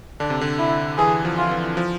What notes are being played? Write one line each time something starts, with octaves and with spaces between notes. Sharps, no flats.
D3 D4
C3
D3
E4
E3 G#4
F3
F4
E3
F3